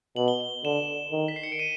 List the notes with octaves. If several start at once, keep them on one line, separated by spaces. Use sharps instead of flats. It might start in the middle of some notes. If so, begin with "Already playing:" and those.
B2 F#7
G7
F#7
D3 E7
D#3
B6
C7
C#7
D7
D#7